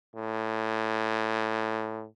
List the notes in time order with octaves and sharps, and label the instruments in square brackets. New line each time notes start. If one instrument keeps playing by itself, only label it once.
[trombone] A2